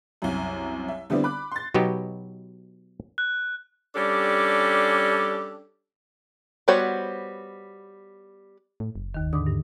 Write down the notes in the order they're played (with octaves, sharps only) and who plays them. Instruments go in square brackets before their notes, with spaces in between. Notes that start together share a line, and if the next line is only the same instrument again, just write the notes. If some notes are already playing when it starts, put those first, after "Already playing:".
[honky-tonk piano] C2 F#2
E5
D3 G3 B3 C4 E4 D5
B5 D6 F#6
C6 A6
[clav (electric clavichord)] B2 F#3 B3 D#4 G4
[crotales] F#6
[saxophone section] G3 C#4 D4 G4 A4
[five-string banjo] G3 B3 F#4 C5 C#5
[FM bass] A2
F#1
[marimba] D#2 D#3
[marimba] G#2 D6 D#6 [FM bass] D3
[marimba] G2